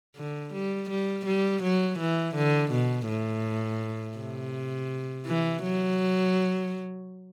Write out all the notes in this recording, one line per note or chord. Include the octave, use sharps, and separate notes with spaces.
D3
G3
G3
G3
F#3
E3
D3
B2
A2
C3
E3
F#3